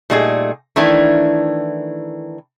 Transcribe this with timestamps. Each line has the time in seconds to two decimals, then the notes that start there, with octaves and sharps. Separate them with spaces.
0.10 A#2 G3 A3 D#4 F#4 G#4
0.76 D#3 E3 A3 D4 E4